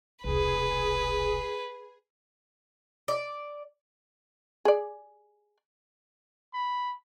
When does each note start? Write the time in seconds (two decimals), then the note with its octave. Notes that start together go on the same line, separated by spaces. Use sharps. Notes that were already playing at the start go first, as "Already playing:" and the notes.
0.24 E1 C2 G#4 B4
3.08 D5
4.65 G#4 D5
6.54 B5